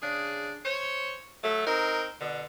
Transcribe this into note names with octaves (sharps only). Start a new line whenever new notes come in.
C#3 D4 G#4
C5 C#5
F#3 A3
C4 D#4 A#4
B2 D3